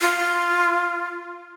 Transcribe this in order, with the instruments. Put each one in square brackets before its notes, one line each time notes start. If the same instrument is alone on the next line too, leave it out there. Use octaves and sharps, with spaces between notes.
[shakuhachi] F4